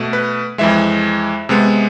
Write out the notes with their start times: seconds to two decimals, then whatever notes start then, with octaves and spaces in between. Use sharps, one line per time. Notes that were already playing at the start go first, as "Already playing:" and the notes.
Already playing: B2 A3
0.13 B4
0.58 F2 E3 G#3 E5
1.49 C3 G#3 B3